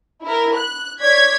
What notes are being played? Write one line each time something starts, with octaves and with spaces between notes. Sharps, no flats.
E4 A#4
F#6
C#5 D5 G#6 B6